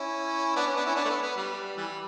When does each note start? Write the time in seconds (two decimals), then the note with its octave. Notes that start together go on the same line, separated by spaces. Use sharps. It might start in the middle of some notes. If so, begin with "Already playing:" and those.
Already playing: C#4 E4
0.56 B3 D4
0.66 C#4
0.76 B3 D4
0.86 C#4 E4
0.96 B3 D4
1.04 A3
1.10 B3
1.23 B3
1.36 G3
1.77 E3 G3